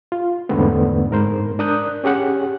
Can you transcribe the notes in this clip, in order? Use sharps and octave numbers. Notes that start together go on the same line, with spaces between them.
F4
E2 G#2 D3 A3 B3 C4
G#2 A#4 C5
D4 A#4 D#6 F#6 G6
C#4 G4 G#4 F#5